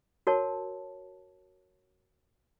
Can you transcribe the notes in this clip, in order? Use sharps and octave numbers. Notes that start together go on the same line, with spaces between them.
F#4 A#4 C#5 A5